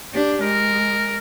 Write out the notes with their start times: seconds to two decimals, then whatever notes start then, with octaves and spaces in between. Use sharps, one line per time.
0.13 D4 G4
0.42 G#3 A#4